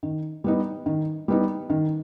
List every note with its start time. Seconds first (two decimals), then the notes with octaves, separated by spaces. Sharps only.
0.03 D#3
0.44 G3 B3 D#4
0.86 D#3
1.28 G3 B3 D#4
1.70 D#3